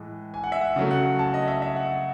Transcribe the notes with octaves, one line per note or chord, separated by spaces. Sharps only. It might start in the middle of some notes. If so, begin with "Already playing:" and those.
Already playing: A2 E3 G#3
G#5
F#5
E5
F#5
C#3 F#3 A3
F#5
A5
D#5
E5
E5
F#5